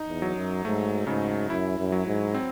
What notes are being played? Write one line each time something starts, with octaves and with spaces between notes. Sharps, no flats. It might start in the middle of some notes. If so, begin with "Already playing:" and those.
Already playing: D#4
E2
F#3
F#2
G#2 A3
G#2 C#3
F#2 E4
F#2
F#3
G#2
C4